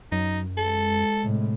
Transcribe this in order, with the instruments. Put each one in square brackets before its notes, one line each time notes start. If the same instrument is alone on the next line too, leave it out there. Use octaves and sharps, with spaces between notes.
[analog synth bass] F#2 [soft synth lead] F#3 [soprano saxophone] D#4
[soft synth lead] G#3 [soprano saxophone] A4
[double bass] A2 C3